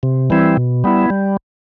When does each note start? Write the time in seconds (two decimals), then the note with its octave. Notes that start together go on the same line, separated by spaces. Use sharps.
0.03 C3
0.30 E3 G3 C4 E4
0.57 B2
0.84 G3 B3 E4
1.10 G3